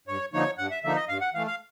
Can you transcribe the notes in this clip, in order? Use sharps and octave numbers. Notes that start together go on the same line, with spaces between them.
G2 C#5
D3 F3 A#3 D#4 C#5
G2 F#5
E5
D3 F3 A#3 D#4 E5
D#5
G2 F5
F#5
E3 A3 F5
F5